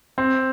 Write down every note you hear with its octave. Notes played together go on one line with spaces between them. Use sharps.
C4